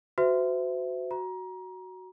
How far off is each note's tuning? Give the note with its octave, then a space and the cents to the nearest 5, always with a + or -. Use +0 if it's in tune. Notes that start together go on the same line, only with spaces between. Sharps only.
F#4 +0 C5 -40 E5 +5
F#4 +5 A#5 +25